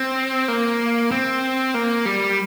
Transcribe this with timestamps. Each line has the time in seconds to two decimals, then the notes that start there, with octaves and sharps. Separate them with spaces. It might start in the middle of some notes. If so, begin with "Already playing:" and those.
Already playing: C4
0.48 A#3
1.11 C4
1.74 A#3
2.05 G3